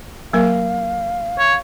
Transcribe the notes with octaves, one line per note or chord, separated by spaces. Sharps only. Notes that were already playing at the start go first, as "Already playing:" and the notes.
F#3 A#3 A#4 F5
C#5